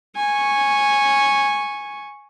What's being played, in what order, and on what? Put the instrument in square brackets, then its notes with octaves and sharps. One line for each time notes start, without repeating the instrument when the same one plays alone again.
[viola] G#5 C#6